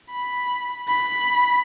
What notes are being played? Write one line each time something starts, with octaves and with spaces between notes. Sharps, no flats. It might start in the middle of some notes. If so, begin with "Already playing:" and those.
B5
B5